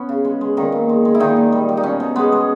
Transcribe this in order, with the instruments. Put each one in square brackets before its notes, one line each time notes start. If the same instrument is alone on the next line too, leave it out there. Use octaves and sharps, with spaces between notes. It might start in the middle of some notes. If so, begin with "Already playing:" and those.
Already playing: [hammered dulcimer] B3 C#4
C#3
G#3
G#3
A#2 D#3 D#4
A#2
G#3
G#3
E4
A#2 D#3 D#4
A#2
G3
G3
D#4
B2 C#4
B2
G#3 B3
G#3